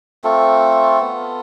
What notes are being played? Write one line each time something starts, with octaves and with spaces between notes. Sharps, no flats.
A3 C4 F4 A4
B3 F4